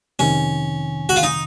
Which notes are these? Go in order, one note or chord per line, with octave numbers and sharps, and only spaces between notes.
F2 C3 D#3 C#4
F#4
F4
D#4